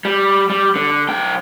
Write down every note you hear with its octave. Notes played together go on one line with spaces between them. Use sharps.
G3
G3
D3
B1 G5